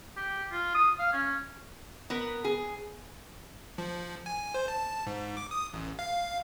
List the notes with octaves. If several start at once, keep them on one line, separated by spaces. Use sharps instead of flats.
G4
F4
D#6
F5
C#4
B3 A#4 B4
G#4
F3
G#5
C5
A5
G#2
D6
D#6
A1
F5